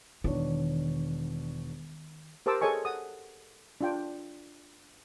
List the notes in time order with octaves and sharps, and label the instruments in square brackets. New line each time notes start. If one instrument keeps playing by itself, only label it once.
[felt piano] E1 D4 C#5 [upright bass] D#3
[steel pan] G4 A#4 C5 A5 D6 E6
G#4 A4 C#5 D#5 G#5 C#6
F#5 D#6
D4 F4 G5